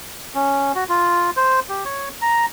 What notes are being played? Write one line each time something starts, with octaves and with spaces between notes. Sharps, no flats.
C#4
F#4
F4
C5
G4
C#5
A#5